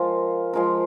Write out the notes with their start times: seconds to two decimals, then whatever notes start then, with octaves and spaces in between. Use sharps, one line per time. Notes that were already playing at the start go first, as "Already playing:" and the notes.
Already playing: F3 G#3 F4 A#4
0.53 F3 G#3 F4 A#4